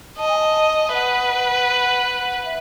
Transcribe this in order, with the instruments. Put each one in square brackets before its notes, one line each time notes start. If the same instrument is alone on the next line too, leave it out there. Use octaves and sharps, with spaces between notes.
[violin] D#5 [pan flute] A5
[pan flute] G#5
A5
E5
[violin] B4 [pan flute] F#5
[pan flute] E5